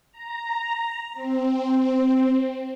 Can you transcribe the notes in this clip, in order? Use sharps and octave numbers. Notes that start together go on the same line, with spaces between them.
A#5
C4